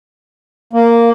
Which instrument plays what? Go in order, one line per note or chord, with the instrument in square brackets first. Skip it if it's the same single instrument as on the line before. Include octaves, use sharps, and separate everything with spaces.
[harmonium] A#3